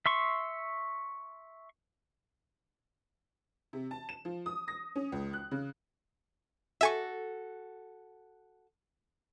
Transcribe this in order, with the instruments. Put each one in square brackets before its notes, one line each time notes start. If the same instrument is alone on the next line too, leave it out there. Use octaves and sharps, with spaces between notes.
[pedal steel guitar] E5 C6 C#6
[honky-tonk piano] C3
A5
E7
F3
D#6
A#6
C#4
C#2
F#6
C#3
[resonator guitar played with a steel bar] F#4 A4 [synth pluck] E5 G#5 C#6